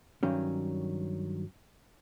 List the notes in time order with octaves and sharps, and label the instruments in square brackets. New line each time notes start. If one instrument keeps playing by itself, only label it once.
[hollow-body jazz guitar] G2 D#3 F#3 C#4